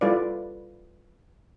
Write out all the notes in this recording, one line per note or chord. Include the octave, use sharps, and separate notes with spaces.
G3 E4 F4 A4 B4 D5